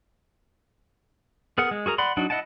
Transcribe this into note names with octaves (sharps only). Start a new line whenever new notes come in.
B3 G#4 A#4 F#5
G#3
F#4 G#4 A#4 A#5
D5 F#5 B5 C6
F#3 D4 D#4 F#4
E4 D#5 F#5 G5 A5